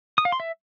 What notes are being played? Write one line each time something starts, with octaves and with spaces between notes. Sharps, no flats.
D#6
F5
C6
E5